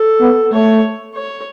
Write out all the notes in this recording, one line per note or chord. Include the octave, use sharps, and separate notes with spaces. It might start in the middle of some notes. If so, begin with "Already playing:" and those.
Already playing: A4
B3
A3 C#5
C#5